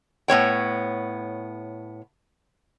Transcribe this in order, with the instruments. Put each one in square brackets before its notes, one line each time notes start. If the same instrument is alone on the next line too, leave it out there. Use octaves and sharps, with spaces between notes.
[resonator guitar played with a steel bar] A2 B3 C#5 G5